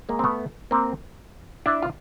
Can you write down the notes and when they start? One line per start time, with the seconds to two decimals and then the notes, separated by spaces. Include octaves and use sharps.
0.09 G#3 A#3
0.19 C4
0.24 A3 B3
0.71 A#3 C4
1.66 D4 E4
1.82 F4